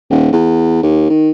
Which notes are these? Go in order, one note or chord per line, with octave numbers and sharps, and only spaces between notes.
D#1
E2
D#2
D#3